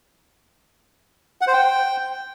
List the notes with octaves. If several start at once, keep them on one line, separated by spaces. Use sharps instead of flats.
F#5
C5
G5